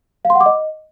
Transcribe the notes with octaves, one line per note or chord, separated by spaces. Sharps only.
F5
C6
F#5
D6
D#5